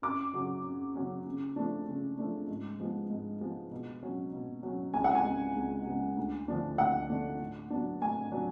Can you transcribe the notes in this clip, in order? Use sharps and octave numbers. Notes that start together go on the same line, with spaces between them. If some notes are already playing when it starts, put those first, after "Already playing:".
F#2 D6
C#3 F#3 C#4
F#2
C#3 F#3 C#4
C#3
F3 A3 D4
C#3
F3 A3 D4
G#2
F3 G#3 B3
G#2
F3 G#3 B3
B2
F#3 C#4
B2
F#3 C#4
C#2 G#5
F#5
G#5
C#3 G#3 B3
C#2
C#3 G#3 B3
D2
D3 F3 A3 D4
D2 F#5
D3 F3 A3 D4
A2
F#3 B3 D4
A2 G#5
F#3 B3 D4